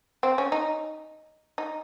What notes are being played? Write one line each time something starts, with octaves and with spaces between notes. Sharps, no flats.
C4
C#4
D#4
D#4